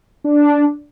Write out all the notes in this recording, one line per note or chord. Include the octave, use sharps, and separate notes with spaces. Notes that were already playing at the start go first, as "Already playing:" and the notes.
D4